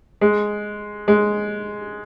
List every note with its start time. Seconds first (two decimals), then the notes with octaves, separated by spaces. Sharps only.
0.21 G#3
1.08 G#3